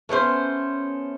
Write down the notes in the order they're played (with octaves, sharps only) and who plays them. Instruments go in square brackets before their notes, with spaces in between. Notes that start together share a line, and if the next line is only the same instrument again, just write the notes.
[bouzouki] A3 B3 C#4 C5